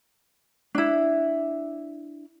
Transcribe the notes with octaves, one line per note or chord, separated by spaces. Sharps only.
D4 E4